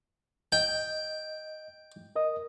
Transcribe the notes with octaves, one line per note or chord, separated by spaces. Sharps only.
D#5 G5
A#4 D#5 D#6